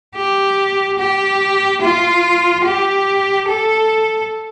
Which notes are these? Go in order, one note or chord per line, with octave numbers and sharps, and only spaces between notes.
G4
G4
F4
G4
A4